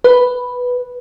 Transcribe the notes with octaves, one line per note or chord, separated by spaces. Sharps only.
B4